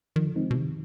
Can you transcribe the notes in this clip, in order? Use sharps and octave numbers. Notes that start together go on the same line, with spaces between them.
D#3 F3
D3
D#3 G#3 C4 D#4
B2
C3 D#3